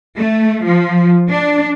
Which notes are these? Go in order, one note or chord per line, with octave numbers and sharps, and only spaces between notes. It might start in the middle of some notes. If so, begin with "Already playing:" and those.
A3
F3
D4